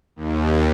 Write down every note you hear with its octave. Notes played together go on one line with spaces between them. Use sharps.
D#2